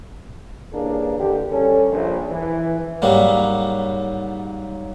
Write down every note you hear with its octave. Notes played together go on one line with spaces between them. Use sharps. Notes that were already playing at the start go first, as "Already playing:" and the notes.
G2 C#3 E3 A#3 D4 G#4
D#2 D3 G4
G3 C#4 A4
A#1
E3
G#2 F#3 G3 A#3